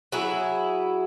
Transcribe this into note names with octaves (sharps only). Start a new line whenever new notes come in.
F#3 E4 G#4